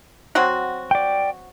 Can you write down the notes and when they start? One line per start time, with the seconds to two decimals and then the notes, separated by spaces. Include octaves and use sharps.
0.35 F#3 C4 F#4
0.91 D5 G5